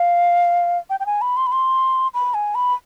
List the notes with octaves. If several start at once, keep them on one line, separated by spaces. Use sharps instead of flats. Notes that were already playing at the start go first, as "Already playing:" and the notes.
Already playing: F5
G5
G5
G#5
B5
C6
B5
C6
B5
G#5
B5